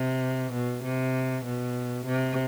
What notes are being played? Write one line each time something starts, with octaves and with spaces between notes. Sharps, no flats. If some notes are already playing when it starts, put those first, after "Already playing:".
Already playing: C3
B2
C3
B2
C3